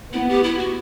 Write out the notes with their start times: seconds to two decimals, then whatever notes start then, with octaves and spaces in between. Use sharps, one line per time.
0.13 B3 E4
0.29 G4
0.43 E4
0.58 F#4